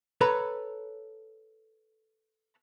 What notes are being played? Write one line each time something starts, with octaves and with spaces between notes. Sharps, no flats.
A4 B4 C#5 A#5 B5